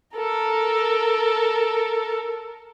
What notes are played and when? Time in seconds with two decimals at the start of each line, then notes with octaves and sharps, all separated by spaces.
0.16 A4 A#4